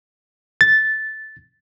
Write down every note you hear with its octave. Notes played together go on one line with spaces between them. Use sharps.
A6